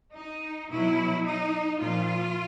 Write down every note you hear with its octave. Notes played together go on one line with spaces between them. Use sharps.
D#4
B2 F#3 E4
D#4
A#2 F3 F4